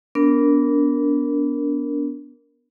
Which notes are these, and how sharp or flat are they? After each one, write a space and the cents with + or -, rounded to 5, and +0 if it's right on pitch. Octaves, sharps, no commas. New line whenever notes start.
B3 +0 D4 -25 A#4 +0